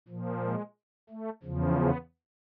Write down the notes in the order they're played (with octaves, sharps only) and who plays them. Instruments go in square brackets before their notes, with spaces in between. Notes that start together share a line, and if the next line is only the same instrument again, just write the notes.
[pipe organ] A#2 F3
G#3
A3
E2 C#3 F3
B3